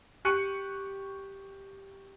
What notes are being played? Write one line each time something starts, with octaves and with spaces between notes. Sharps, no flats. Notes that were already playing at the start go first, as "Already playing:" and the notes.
G4 C#6 F#6 C#7 D#7